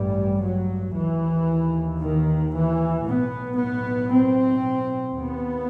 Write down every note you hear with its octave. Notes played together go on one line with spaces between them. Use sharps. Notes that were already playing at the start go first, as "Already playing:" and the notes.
Already playing: A1 G2 G3
F#3
D#2 E3
D#3
E3
B1 A2 B3
B3
C4
D#2 B3